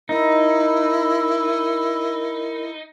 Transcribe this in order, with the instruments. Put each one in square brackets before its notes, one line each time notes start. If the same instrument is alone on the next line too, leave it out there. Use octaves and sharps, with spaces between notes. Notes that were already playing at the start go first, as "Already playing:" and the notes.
[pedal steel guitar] D#4 [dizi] E4 [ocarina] A#4